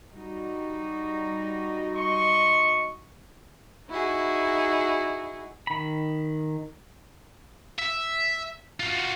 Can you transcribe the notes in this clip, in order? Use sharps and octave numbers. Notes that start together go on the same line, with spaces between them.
G3 D#4 F#4
D#5 C6 C#6
D#4 E4 F#4 G#4
D#3 B5
E5
F4 F#4